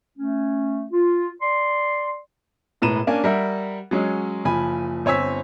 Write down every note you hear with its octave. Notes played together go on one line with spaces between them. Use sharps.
A3 C#4
F4
D5 C6
E1 A2 B4 A#5 D#7 E7
A#3 C#4 D4 G#5
G3 A#4 E5 F#5
F#3 G#3 C#4
F#1 F3 G#5 B5 D#7
G1 C4 C#5 G#5 E6 B6